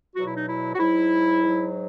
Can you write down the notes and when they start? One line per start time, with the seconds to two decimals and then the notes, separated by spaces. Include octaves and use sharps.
0.15 E2 B2 F#3 F#4
0.26 E4
0.37 D#4
0.47 E4
0.75 F#4
0.79 G#2 F#3 E4
1.42 G#2 F#3